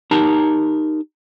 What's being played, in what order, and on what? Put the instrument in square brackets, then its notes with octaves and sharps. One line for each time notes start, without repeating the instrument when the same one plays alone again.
[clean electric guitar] D#4 G4 A#4 A5 A#5